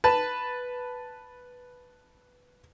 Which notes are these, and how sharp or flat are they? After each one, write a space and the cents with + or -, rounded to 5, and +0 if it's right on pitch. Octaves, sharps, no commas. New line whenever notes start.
B4 +0 A5 +0